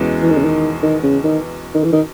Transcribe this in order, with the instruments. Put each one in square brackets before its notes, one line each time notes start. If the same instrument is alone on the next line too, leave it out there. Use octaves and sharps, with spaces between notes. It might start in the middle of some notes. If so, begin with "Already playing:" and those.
Already playing: [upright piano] E2 B2 G#3 C#4
[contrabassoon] E3
D#3
C#3
D#3
D#3
C#3
D#3
D#3
E3
D#3